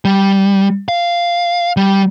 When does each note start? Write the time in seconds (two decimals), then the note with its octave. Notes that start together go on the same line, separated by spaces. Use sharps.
0.05 G3
0.89 F5
1.77 G3